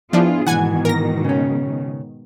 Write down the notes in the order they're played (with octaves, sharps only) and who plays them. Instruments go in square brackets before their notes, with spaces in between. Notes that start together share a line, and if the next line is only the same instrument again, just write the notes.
[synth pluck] F3 D4 [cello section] B3 F4 G#4 [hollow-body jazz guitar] E4
[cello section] G#2 B2 D#3 [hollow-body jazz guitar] E3 [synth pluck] F#5 G#5 G#6
[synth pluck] A#4 A#6
[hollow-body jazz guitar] C#3 C#4